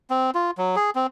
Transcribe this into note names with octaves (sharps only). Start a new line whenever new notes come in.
C4
F4
F#3
G#4
C4